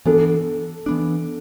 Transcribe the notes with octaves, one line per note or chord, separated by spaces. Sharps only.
E3 B3 D4 A4
E3 B3 D4